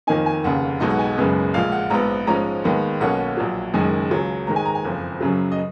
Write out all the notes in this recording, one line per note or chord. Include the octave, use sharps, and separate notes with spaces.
F2 D#3 A#3 D#4 G#5
G#5
F1 D#2 C#3 F#5
B1 B2 G#3 D#4 D#5
F#5
G#5
F#1 F#2 C#3 G#3 B3
A#1 A#2 G#3 F5
F#5
A#1 G#2 F3 B3 A#5
G#2 F3 G#3 C#4 A#5
D#2 D#3 G#3 B3
B1 B2 A#3 C#4 F#5
A#1 A#2 F#3
F#1 F#2 D#3 G#3 G#5
C#2 C#3 F#3
G#2 D#3 G#3 A#5
G#5
A#5
G#5
F#1 F2 F3
F#2 C#3 F#3
D#5